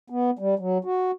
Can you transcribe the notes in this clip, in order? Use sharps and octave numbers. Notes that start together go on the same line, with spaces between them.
B3
G3
F#3
F#4